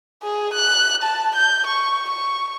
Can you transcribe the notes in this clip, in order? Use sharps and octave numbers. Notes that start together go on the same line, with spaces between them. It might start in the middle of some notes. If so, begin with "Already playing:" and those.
G#4
F#6
A5
G6
C#6
C#6